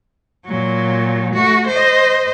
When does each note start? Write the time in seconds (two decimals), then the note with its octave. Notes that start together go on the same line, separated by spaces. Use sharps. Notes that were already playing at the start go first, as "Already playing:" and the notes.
0.46 A#2 F#3
1.34 A3 F#4
1.67 C5 D#5